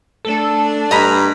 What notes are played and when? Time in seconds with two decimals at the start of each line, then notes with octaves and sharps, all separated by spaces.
0.25 A3 D4 A4
0.91 G2 D#5 A#5 B5